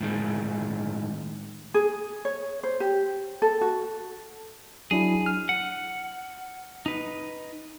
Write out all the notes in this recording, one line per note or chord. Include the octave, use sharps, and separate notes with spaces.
A2 D#3 G#3
G#4
C#5
C5
G4
A4
F#4
F#3 D4 E4 G#4
F6
F#5
D#4 B4